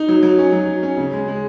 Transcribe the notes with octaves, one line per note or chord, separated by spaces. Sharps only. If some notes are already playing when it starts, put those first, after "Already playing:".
Already playing: D#4
F#3
F#3
C#4
F#3
F#3
C#4
C#3
G#3
G#3